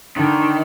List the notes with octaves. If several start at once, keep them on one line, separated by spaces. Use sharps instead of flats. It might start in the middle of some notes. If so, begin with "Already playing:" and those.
D3 D#3